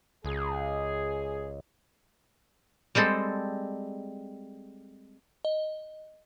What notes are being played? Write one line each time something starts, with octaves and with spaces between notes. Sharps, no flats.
C#2 G#4
G3 G#3 C4 A4
D#5